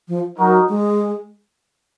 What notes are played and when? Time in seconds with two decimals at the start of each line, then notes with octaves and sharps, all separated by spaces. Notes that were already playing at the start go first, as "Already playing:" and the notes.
0.08 F3
0.38 F#3 D#4 F#4 A#4
0.69 G#3